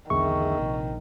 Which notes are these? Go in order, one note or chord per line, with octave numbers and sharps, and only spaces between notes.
B1 E2 D3 D#3 G#4 E5 C#6
A#1 C3